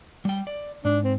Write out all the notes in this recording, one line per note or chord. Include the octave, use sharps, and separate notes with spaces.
G3 G5
D5
G#2 D4
C4